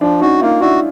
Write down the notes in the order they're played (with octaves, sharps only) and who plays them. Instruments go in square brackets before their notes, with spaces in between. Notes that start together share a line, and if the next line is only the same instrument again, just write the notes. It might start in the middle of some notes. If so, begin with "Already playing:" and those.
[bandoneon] F3 [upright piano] D4
[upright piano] C#4 D#4 [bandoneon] F#4
[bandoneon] A#3 [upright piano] D#4 F4
[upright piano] D4 E4 [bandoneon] F#4